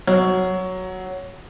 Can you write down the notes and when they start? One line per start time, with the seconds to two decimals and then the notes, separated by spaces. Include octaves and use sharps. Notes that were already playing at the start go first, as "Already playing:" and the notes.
0.07 F#3